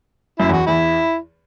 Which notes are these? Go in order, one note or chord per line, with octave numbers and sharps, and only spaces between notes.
F#2 E4
E2 F#4
E2 E4